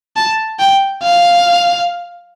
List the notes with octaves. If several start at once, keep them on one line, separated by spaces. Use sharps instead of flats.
A5
G5
F5